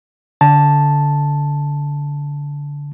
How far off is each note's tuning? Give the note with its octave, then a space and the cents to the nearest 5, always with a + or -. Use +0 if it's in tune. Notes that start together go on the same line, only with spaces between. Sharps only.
D3 -25 A5 +0